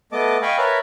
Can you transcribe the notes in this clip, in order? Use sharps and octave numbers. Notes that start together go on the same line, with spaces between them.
A3 B3 D#5 A5 D6
D#5 F5 G5 G#5 B5 C#6
A#4 B4 C#5 E5 A5 B5